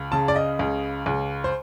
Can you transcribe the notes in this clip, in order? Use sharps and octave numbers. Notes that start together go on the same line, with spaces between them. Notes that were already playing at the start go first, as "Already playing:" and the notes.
Already playing: C#2
C#3 A5
D5
D#5
C#2
C#2
C5